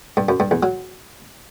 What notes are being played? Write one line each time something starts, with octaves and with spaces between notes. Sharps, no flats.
G2
F#2
G2
E2
F#3